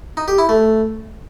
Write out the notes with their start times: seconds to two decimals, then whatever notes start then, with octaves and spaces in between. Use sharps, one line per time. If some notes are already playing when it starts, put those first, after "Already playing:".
0.17 D#4
0.28 G4
0.38 E4
0.49 A3